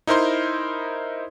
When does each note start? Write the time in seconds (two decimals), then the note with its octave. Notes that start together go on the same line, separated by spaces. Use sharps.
0.07 D#4 E4 A#4 C5 C6